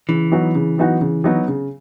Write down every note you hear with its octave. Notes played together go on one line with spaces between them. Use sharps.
C#3 E3
F#3 B3 D#4 F#4
C#3
F#3 B3 D#4 F#4
C#3
F#3 B3 D#4 F#4
C#3